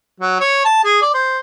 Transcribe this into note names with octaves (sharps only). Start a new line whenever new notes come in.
F#3
C#5
A5
G#4
D5
C5